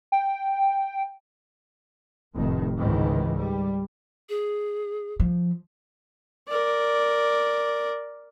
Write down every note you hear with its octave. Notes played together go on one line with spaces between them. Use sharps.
G5
F1 A2 D#3
C#2 G#2 D#3 E3
G3
G#4
F3
A#4 D5